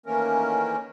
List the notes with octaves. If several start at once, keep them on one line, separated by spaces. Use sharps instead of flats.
D#3 E3 A3 A#3 C#4 A#4